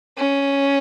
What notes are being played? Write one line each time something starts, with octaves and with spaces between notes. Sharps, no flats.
C#4